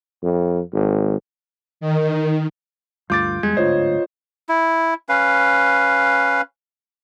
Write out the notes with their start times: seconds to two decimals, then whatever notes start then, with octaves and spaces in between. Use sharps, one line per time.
0.23 F2
0.73 G#1
1.81 D#3
3.10 D2 G2 A3 F4 D6 G6 A6
3.43 E2 G3 G#3 G#6
3.57 D1 D2 G#2 F4 C5 C#5 D#5
4.49 E4
5.09 C#4 B4 F5